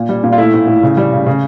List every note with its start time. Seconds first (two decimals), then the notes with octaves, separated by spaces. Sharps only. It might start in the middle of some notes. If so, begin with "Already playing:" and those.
Already playing: A#2
0.09 G3
0.24 A#2
0.33 F4
0.38 A3 E4
0.54 A2
0.67 A2
0.83 C#3
0.97 G3
1.12 C#3
1.26 C#3